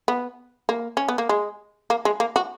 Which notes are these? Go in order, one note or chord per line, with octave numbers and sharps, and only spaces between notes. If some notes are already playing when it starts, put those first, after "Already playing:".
B3
A#3
C#4
B3
A#3
G#3
A#3
G#3
A#3
F#4